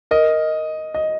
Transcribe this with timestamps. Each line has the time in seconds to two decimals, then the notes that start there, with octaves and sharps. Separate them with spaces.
0.11 A#4 D#5
0.94 D#5